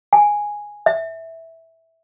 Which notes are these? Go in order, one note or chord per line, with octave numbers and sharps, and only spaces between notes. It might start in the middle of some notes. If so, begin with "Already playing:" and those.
G#5
E5